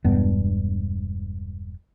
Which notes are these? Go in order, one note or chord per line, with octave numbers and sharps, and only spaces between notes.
E1 G2 B3